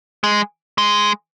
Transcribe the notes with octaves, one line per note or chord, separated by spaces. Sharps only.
G#3
G#3